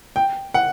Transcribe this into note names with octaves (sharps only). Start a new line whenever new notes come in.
G5
F#5